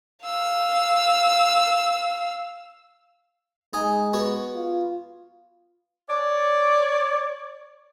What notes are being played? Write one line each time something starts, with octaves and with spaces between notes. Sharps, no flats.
F5 E6
G#3 D#4 D#5 G#5
B3 F#4 C#5
F4
C#5 D5